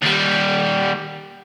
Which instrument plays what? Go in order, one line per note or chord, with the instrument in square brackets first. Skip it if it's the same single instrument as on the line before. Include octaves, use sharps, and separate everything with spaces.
[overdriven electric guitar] D#2 G3